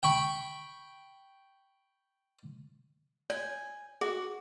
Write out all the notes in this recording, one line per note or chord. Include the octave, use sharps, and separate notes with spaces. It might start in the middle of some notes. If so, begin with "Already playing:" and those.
G5 B5 C#6
C#5 G#5
F#4 G#4